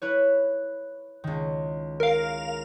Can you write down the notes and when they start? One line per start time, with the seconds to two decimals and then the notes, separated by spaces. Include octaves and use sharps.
0.02 E4 B4 C#5
1.24 C#2 D#3
2.00 A#4 F5